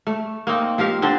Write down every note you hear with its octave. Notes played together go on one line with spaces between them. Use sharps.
A3
A#3 C4 D#4
F3 G4 A#4 F5
D3 C4 D4